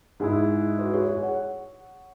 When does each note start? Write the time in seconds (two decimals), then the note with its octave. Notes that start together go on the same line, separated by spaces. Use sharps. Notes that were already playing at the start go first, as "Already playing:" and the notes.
0.20 G#2 G#3 E4 G#4
0.79 F#4 B4
0.93 G#4 C#5
1.08 G#4 C#5
1.23 C#5 F#5